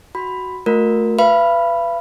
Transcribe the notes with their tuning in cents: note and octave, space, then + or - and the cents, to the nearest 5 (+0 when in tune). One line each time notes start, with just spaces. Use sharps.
F#4 +5 B5 +10
A3 +0 F#4 -45 A#4 +0
B4 +0 F5 -45 B5 +0